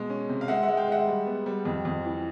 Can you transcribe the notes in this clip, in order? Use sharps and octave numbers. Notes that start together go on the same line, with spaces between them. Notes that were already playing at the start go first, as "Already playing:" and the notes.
Already playing: B2 G#3
C#4
C3
F5
G#3 E5 F#5
E5 F#5
G#3
F5 G5
G#3 E5 F#5
G3
B3
G3
F2
F2
E3